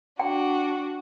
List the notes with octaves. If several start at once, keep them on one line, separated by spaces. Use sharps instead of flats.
D4 F#4 G5